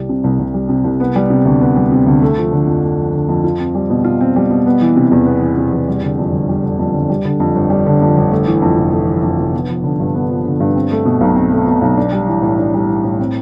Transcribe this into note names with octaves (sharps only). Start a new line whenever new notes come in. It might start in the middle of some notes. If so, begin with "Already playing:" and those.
Already playing: C2 G3
C3
C2
C2
G3
C3
C2
B3
G3
C3
D2
B3
G3
C3
D2
A3
F3
D3
F2
A3
F3
D3
F2
F4
C4
G3
B2
F4
C4
G3
B2
B3
E3
C3
E2
B3
E3
C3
E2
G3
D3
F2
G1
G3
D3
F2
G1
G3
D3
F2
G1
G3
D3
F2
G1
A3
E3
F2
F1
A3
E3
F2
F1
B3
F3
D3
G2
B3
F3
D3
G2
C4
A3
B2
B1
C4
A3
B2
B1
D4
G3
E3
A2
D4
G3
E3
A2
C4